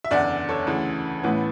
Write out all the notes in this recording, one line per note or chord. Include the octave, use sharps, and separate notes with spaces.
E5
F#1 E2 D3 D5 F#5
A4 C#5
D2 C#3 E3
A1 A2 E3 B3